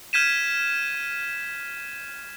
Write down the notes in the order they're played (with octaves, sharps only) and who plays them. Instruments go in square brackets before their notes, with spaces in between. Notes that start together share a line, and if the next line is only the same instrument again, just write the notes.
[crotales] F6 G6 G#6 B6 D#7 E7